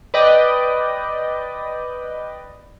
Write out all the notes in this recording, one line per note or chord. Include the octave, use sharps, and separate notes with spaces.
B4 D5 D#5 G5